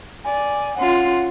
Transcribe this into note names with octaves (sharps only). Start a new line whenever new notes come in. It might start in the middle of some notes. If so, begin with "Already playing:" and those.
D5 G#5
C#4 F4 F#5 C6